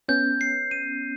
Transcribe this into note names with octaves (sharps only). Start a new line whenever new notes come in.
B3 C#4 G6
C7
D#7